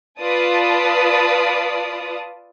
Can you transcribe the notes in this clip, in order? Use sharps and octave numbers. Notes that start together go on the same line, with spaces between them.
F4 B4 D5 A5 D#6